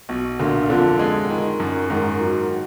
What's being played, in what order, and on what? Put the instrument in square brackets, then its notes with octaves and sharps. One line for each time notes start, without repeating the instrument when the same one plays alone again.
[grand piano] B1 [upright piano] B2
[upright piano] D2 D3 [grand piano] A#2
[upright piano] F2 F3 [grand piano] D3
[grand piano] G#3
D#3
F#2
[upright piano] G#2 G#3 [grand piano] D#3
[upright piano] F#3